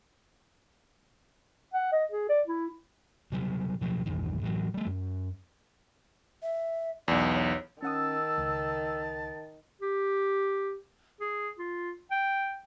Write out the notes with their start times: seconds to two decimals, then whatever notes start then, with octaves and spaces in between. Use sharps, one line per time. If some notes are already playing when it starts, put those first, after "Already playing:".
1.74 F#5
1.92 D#5
2.12 G#4
2.29 D5
2.47 E4
3.32 C3 F#3 G3
3.81 B2 F3 F#3
4.06 A#1 E2 G2 D#3
4.41 A2 E3 F#3
4.74 G3 A3
4.86 F#2
6.43 E5
7.08 B1 E2 D5
7.33 C#5
7.83 D#3 C#4 F#5 A5 D#6 E6
8.38 C#2
9.81 G4
11.21 G#4
11.59 F4
12.11 G5